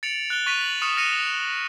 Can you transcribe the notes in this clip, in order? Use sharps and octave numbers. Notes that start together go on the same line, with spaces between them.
A6 C#7 D7 F7 F#7
F#6 A6 F7 G7
C#6 A6 B6 D#7 F7
F#7
C#6 D#6 F6 C#7 E7
D#6 F6 A#6 C#7 D#7 F7